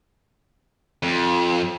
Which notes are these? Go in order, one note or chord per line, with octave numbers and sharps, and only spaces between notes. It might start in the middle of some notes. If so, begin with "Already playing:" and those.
F2